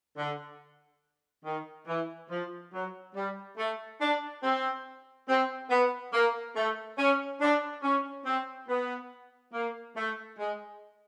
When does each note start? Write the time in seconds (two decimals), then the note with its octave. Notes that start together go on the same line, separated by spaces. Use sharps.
0.17 D3
1.45 D#3
1.88 E3
2.30 F3
2.73 F#3
3.15 G3
3.58 A3
4.01 D4
4.43 C4
5.29 C4
5.70 B3
6.13 A#3
6.56 A3
6.98 C#4
7.41 D4
7.83 C#4
8.26 C4
8.69 B3
9.54 A#3
9.96 A3
10.39 G#3